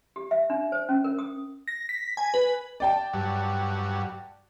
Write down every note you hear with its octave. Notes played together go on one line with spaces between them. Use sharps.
G4
E5
D4
C5
C#4
A#4
D#6
A#6
B6
G#5
B4
D5 G5 A5
G2 F#3